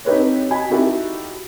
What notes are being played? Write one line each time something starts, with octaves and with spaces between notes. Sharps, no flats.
C4 D#4 G4 A4 B4 C#5
F#4 D#5 G#5 B5
D#4 E4 F#4 G4 A4